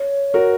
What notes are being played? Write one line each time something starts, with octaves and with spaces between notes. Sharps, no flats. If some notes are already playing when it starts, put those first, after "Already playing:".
Already playing: C#5
F#4 A#4